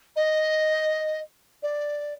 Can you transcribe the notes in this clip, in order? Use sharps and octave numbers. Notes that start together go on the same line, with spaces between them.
D#5
D5